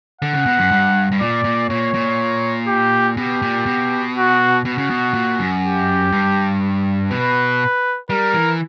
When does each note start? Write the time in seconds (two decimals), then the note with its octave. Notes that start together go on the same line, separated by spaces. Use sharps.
0.21 D3 F#5
0.34 C#3
0.46 B2
0.59 F#2
0.71 G2
1.12 G2
1.20 A#2 D5
1.44 A#2
1.69 A#2 C#5
1.94 A#2
2.67 G4
3.17 B2 G4
3.42 A#2
3.66 B2
4.16 F#4
4.65 B2 F#4
4.78 C#3
4.90 B2
5.14 A#2
5.39 F#2
5.64 G4
6.12 G2
7.11 B2 B4
8.10 G3 A#4
8.34 E3